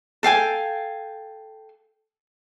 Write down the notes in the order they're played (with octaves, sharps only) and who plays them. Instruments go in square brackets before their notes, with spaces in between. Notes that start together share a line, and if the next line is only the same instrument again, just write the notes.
[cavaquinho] A4 F5 G5 G#5